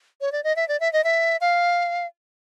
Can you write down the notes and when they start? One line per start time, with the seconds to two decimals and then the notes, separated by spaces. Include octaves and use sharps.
0.21 C#5
0.32 D5
0.44 D#5
0.56 E5
0.68 D5
0.80 E5
0.93 D#5
1.04 E5
1.41 F5